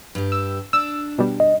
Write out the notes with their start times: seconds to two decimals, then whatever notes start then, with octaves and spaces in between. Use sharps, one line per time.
0.15 G2 G4
0.32 E6
0.73 D4 E6
1.18 B2 G3
1.40 D#5